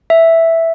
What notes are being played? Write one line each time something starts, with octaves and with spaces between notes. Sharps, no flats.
E5